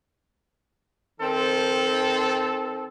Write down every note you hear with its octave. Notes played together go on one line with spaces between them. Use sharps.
D#3 C4 A4